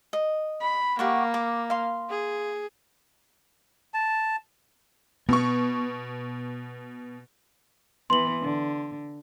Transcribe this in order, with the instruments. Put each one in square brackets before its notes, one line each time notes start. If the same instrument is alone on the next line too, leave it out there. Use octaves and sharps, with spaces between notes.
[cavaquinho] D#5
[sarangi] B5
[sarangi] A#3 [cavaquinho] G4 F#5 C#6
[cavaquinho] D6
F5 C6
[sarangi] G#4
[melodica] A5
[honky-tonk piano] B2 C#6 [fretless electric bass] B3
[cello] E3 B3 [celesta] C6 F#7
[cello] D3